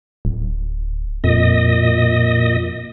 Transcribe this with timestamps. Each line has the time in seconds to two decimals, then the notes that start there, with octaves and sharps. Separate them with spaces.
0.25 D1
1.24 F2 A#2 D#5